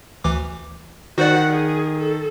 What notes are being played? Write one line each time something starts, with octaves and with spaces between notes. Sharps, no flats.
D2 E3 D6
D#3 F#4 C5 D5 F#5
G#4
A4